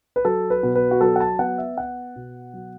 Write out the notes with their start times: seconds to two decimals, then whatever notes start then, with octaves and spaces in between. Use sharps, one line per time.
0.16 B4
0.25 F#3 A4
0.50 B4
0.63 B2
0.75 B4
0.91 F#4
1.01 F#3 A4
1.16 F#5
1.20 A5
1.39 B3 F#5
1.58 E5
1.77 B3 F#5
2.16 B2
2.53 F#3